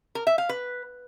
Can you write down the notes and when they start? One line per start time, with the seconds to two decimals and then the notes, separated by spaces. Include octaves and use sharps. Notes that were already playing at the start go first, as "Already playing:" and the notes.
0.15 A#4
0.27 E5
0.38 F5
0.49 B4